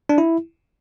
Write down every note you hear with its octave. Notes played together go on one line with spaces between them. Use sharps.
D4
E4